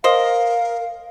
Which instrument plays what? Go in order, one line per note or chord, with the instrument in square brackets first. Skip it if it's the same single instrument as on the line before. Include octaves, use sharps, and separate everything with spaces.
[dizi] A#4 [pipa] C5 D#5 [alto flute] F5